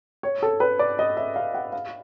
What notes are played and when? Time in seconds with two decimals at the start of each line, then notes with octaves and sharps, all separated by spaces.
0.23 C#5
0.42 A4
0.60 B4
0.79 D5
0.99 D#5
1.17 E5
1.36 F5
1.54 F#5
1.73 F5